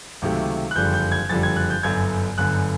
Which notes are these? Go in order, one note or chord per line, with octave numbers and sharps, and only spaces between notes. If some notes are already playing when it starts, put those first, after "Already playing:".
C#2 C3 D#3 F#3 A3
F#6
F#1 F2 D3 G3 G6
G6
G#6
F#1 F2 D3 G3 A6
G#6
F#6
G6
G1 F#2 D3 G#6
G1 F#2 D3 F#6